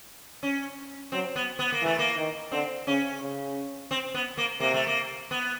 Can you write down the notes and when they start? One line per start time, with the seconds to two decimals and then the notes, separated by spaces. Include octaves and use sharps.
0.43 C#4
1.12 F#3 C4
1.36 B3
1.59 B3
1.72 A#3
1.82 E3 A3
1.99 A#3
2.17 D#3
2.52 D3 C4
2.87 C#3 C#4
3.21 C#3
3.91 C4
4.14 B3
4.37 A#3
4.60 C3 A#3
4.74 A3
4.87 A#3
5.31 B3